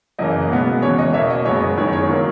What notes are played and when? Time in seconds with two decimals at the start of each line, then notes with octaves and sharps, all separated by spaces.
0.18 F#2 C#3 E3 A#3 D#5
0.50 B2 G#3 B3
0.82 E2 C#3 E3 C#5
0.98 D#5
1.14 B2 C#5 E5
1.17 A#3
1.30 D#5
1.45 F#2 C#3 G#3 B3 C#5
1.77 F#2 D#3 G#3 B3 C#5
1.93 C#5
2.09 D#3 F#3 A#3